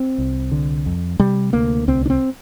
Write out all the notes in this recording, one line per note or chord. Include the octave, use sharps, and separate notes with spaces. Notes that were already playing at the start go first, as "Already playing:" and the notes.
Already playing: C4
C2
D3
F2
C3 G3
D2 A#3
C2 C4
D4
C4